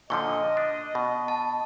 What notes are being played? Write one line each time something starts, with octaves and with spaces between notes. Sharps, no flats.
A#2 D3 F3 D#5 C#6
D4
B2
A5